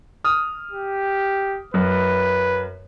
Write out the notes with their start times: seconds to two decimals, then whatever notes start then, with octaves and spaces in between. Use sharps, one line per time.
0.24 D#6 F6
0.72 G4
1.74 F#2 B4